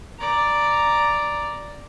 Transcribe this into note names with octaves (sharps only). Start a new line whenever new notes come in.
D5 A#5